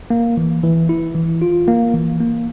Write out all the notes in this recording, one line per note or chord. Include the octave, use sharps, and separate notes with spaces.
A#3
E3
E3
E4
E3
F4
A#3
E3
A#3